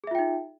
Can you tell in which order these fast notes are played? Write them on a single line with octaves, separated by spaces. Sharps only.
G#4 E5 F4 G5 D#4